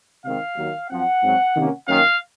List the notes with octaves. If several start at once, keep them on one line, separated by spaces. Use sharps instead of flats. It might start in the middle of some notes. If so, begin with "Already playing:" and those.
C3 D#3 G#3 C4 F5
D#2 D#3 F#3
F#2 F3 C4 F#5
G#2 F#3 C4
C3 D#3 A#3 C#4
F#2 D#3 A#3 C#4 F5